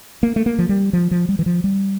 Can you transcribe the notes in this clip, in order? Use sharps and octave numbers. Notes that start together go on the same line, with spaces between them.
A#3
A3
A#3
F3
G3
F3
F3
G3
E3
F3
G3